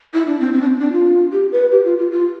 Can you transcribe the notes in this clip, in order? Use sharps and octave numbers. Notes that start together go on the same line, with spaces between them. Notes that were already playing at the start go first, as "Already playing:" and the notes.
E4
D4
C4
C4
D4
C4
D4
F4
G4
B4
G4
F4
F4
F4